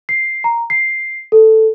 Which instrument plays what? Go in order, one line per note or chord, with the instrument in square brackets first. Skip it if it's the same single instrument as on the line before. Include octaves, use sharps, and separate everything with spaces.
[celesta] C7
A#5
C7
A4